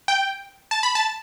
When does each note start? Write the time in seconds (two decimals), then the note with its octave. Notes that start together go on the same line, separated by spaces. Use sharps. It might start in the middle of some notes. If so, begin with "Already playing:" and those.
0.08 G5
0.71 A5
0.83 B5
0.95 A5